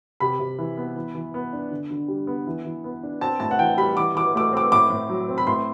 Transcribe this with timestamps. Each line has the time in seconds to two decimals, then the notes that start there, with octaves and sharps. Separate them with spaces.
0.20 C3 B5
0.39 C3
0.58 E3
0.77 B3
0.96 E3
1.15 E3
1.34 B3
1.53 D4
1.71 D3
1.91 D3
2.08 G3
2.27 B3
2.47 E3
2.65 E3
2.84 B3
3.03 D4
3.21 C4 A5
3.40 A2 A5
3.51 F#5
3.59 E3 G5
3.77 G3 B5
3.96 E3 D6
4.15 E3 D6
4.35 A3 D6
4.53 C4 D6
4.72 A2 D6
4.90 A2
5.10 F#3
5.29 C4
5.38 B5
5.47 A2 C6